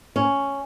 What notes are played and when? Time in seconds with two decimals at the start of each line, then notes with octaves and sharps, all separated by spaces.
0.16 C#4